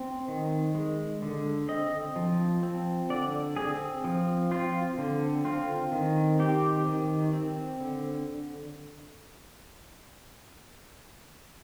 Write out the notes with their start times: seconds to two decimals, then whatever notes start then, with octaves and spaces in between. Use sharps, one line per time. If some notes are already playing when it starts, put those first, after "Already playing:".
Already playing: C4
0.28 D#3
0.75 G#3
1.22 D3
1.68 C4 D#5
2.16 F3
2.63 C4
3.10 D3 D5
3.56 C4 G#4
4.04 F3
4.51 C4 F4
4.98 D3
5.45 C4 F4
5.92 D#3
6.39 C4 G4
6.86 D#3
7.33 C4
7.80 D3